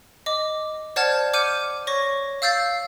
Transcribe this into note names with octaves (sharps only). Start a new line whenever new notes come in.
D#5 D6
C5 D5 F#5 A5 F6 G#6
D6 F6 G6 C#7 D#7
C#5 C#6 A#6
F5 E6 G6 A6 C7